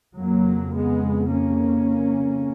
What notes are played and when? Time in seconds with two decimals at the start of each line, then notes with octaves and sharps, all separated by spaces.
0.18 F2 C#3 F#3 A#3
0.74 G#3 B3
1.30 A#3 C#4